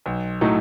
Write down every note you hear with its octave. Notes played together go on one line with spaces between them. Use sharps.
B1
A2 F#3 A3 D#4